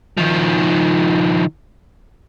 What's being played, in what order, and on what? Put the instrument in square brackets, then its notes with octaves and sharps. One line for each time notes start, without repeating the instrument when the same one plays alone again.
[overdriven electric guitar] D#3 F3